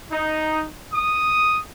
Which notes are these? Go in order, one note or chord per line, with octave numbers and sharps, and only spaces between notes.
D#4
D#6